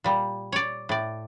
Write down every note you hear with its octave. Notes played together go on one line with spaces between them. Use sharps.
A#2 G3
C#5 D5
A2 D5